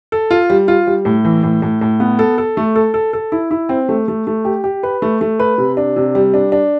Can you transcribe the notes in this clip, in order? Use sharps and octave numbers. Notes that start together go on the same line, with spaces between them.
A4
F4
G3
F4
G3
A2
E3
A2
A2
A2
B3
A4
A4
A3
A4
A4
A4
E4
E4
C4
A3
A3
A3
G4
G4
B4
A3
A3
B4
C3
D4
C3
G3
D4
D4